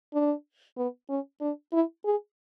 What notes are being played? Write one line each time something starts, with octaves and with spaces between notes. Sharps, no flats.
D4
B3
C#4
D4
E4
G#4